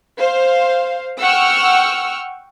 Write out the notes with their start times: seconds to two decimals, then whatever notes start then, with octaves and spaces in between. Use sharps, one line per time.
0.19 C5 F5
1.21 F#5 G5 C#6 E6 F6